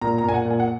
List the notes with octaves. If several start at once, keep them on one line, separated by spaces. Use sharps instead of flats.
A#2 A#5
A#5
A#2 G#5
F#5
A#2
G#5
F#5